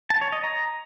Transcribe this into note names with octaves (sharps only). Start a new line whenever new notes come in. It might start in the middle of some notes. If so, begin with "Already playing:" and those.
A5
C#5
D#5
A#5